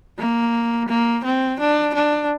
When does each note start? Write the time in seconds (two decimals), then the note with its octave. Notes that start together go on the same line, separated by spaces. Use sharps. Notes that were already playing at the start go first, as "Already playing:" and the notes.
0.18 A#3
0.89 A#3
1.24 C4
1.60 D4
1.95 D4